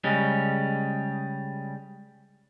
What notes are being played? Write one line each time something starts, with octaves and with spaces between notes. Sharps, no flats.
C#3 G3 G#3 C#4